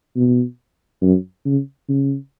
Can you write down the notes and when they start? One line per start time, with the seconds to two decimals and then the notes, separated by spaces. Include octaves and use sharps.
0.16 B2
1.02 F#2
1.45 C#3
1.89 C#3